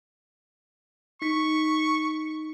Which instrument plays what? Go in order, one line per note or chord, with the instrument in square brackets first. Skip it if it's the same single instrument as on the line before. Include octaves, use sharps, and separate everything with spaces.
[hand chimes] D#4 B6 [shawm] C#6